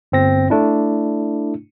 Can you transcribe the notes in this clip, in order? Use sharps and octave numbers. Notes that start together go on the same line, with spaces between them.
G1 C4 A#6
A3 D4 E4